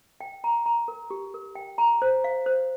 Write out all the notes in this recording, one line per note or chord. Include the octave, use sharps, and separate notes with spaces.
G5
A#5
A#5
A#4
G4
A#4
G5
A#5
C5
F5
C5